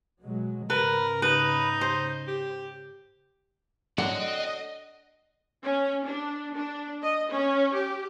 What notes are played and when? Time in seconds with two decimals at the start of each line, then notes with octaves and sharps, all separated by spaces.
0.22 B2 F#3 G#3
0.70 G#2 C#3 A#4 B4
1.22 D#4 B4
1.81 C5
2.28 G4
3.98 D3 F#3 C4 D#5 F#5
5.63 C#4
6.06 D4
6.54 D4
7.03 D#5
7.31 C#4
7.74 G4